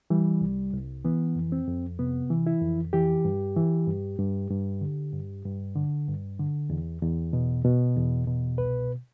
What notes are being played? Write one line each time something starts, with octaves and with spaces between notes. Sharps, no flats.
E3 G3
C2
C2
E3 B3
F2
C4
F2
C3 B3
E3
E4
F2
E3 G4
G2
E3
G2
G2
G2
D3
G2
G2
D3
G2
D3
E2
E2
B2
B2
E2
B2
C2 B4